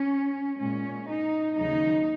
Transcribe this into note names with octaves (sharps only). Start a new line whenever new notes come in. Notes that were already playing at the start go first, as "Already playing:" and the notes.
Already playing: C#4
A#2 G#3 C#4
D#4
D#2 C#3 F#3 D#4